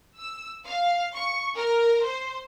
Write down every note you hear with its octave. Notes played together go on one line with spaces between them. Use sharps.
E6
F5
C#6
A#4
C5